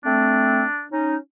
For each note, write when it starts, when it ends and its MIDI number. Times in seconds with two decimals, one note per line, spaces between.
0.05 0.63 57
0.05 0.63 60
0.05 0.84 62
0.91 1.16 61
0.91 1.16 63